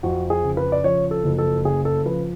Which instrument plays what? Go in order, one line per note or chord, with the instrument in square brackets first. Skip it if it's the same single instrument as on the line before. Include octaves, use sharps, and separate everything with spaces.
[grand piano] F2 F#4
G#4
C#3
B4
D5
F3 C#5
A4
F#1
A4
C#3 G#4
A4
F3 B4